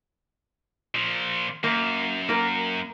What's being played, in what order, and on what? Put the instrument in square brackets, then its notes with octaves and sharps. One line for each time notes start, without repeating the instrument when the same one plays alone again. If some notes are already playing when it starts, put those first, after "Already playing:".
[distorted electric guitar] A#2 F3
[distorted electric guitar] F#2 [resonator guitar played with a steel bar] A#3
[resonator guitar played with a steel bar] A#3 A#4